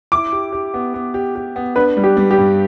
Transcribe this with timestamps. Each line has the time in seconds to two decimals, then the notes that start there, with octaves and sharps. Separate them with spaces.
0.12 E4 D6
0.32 G4
0.52 G4
0.74 B3
0.94 B3
1.14 G4
1.35 G4
1.56 B3
1.76 D4 B4
1.97 G3
2.04 G4
2.17 G3
2.31 G4
2.38 G2